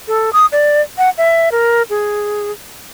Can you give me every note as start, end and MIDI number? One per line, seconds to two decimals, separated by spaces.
0.08 0.33 69
0.33 0.46 87
0.52 0.82 74
0.98 1.10 78
1.18 1.49 76
1.52 1.83 70
1.90 2.52 68